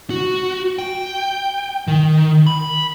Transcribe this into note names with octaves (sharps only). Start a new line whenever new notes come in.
F#4
G5
D#3
B5